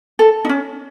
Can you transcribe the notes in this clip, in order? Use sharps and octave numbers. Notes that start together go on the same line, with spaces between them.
A4
D#4
C#4